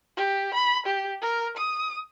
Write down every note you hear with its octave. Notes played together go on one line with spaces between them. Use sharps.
G4
B5
G4
A#4
D#6